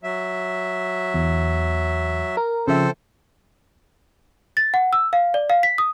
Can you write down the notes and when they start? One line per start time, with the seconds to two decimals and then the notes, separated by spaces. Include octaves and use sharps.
0.03 F#3 E5
1.14 E2
2.37 A#4
2.67 C#3 F3 C4 A4 C5 E5
4.57 A6
4.74 F#5
4.93 E6
5.13 F5
5.34 D5
5.50 F5
5.63 B6
5.78 D#6